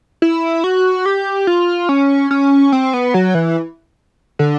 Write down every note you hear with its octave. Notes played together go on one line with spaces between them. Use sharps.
E4
F#4
G4
F4
C#4
C#4
C4
B3
F#3
E3
D3